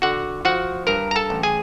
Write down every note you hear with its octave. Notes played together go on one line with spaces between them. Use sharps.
D3 F#4 F#5
F3 F#4 F#5
G2 A#4 A#5
A#5
A4 A5
A1
G#4 G#5